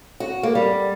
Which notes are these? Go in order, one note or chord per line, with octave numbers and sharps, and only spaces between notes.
F#4
A#3
G3